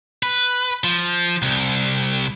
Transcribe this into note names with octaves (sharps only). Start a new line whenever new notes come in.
B4
F3
C2